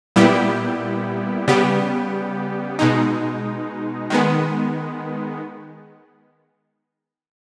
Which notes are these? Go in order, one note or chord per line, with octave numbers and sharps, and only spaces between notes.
A#2 G3 B3 E4 G4
C#3 G3 B3 G4
B2 G#3 D#4
D#3 G#3 B3